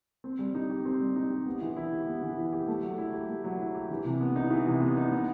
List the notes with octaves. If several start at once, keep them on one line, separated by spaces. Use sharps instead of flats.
C4
G3
D#4
G4
C4
G3
D#4
G4
B3
E3
E4
G4
B3
E3
E4
G4
A3
F#3
E4
G4
A3
F#3
E4
G4
E3
C3
B3
D#4
E3
C3
B3
D#4
B3